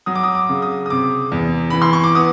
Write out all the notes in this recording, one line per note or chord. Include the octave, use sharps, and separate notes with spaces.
F#3 D#6
D6
D#6
D6
C#3
D#6
D#6
C3 D6
E2
E3 B5
C6
C#6
D6
B3 D#6